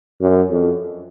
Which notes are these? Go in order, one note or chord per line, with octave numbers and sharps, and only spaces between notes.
F#2
F2